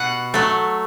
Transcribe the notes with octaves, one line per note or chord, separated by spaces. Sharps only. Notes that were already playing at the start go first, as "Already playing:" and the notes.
Already playing: B2 F#5
F#3 A3